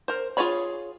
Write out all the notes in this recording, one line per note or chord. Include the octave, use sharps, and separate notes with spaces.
A#4 C5
F4 F#4 G#4 C#5 B5